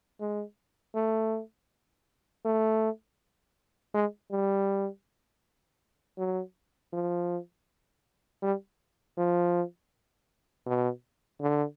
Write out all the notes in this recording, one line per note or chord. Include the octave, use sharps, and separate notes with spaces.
G#3
A3
A3
G#3
G3
F#3
F3
G3
F3
B2
D3